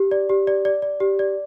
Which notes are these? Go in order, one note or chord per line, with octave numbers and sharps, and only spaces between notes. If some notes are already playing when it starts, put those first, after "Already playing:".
Already playing: G4
D5
G4
D5
D5
D5
G4
D5